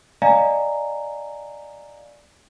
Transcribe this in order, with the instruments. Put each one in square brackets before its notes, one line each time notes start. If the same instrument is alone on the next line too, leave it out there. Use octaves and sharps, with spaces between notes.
[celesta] D5 D#5 F5 G#5 A#5